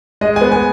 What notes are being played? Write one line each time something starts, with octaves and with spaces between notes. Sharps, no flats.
G#3 D#5
G#5
B3
G#5